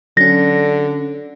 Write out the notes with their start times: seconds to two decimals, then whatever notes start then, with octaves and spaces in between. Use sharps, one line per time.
0.17 D3 F#3 C#4 A#6